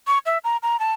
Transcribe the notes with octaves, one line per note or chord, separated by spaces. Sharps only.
C#6
E5
A#5
A#5
A5